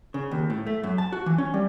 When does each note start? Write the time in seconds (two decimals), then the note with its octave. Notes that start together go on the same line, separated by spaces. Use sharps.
0.14 C#3
0.31 D#2
0.50 A2
0.66 A3
0.83 F#2
0.98 A5
1.12 F#4
1.26 E3
1.38 C#4
1.54 G3